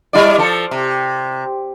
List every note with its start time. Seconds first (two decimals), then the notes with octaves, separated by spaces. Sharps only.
0.13 G3 E4 D5
0.38 F3 A4
0.71 C3